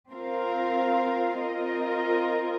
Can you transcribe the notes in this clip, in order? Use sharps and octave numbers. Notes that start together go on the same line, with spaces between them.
C4 F4 A#4 F5
C4 F4 A#4 D#5